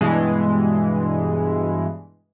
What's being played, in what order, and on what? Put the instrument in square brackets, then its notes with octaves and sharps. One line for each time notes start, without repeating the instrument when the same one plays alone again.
[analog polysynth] G2 B2 E3 G#3